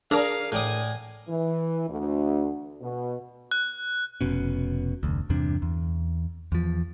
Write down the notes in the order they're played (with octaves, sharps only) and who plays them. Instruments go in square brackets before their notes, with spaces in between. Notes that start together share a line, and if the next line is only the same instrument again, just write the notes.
[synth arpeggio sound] D4 [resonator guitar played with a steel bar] G#4 A#4 [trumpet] F5 [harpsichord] A#5
[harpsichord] A2 D5 D#6 [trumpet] G#5
[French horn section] E3
D2
B2
[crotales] F#6
[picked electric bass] F1 B2 C#4
F1 D2
E2 G2 C3 D4
E2
E2 F3